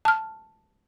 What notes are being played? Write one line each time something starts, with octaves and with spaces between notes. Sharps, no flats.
A5 F6